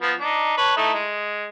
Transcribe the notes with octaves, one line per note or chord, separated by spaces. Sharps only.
F3 B3
D4 D#4
B4 C#5 A5
A3 D#4 E4
G#3